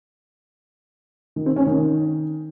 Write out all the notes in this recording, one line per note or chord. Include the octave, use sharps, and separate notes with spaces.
D#3
C4
C#4
D#3